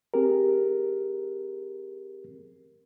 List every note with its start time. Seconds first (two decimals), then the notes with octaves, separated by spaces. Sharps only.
0.14 C4 G4 G#4 A#4